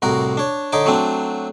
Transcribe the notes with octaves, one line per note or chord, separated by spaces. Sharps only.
C2 A2 F#4 A#4
D4 C#5
D3 D#4 C#5 D6
F#3 A3 C4 D4